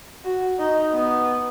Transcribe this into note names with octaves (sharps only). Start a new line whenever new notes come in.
F#4
D#4
B3